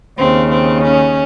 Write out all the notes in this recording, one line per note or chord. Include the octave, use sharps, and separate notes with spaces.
D#2 C#3 C4
C4
C#4